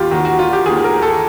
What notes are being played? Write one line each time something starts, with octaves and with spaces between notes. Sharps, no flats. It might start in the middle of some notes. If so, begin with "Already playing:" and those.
Already playing: D#2 D#3 F4 G4
D#2 D#3 F#4
F#4
F4
G4
D#2 D#3 G#4
A#4
A4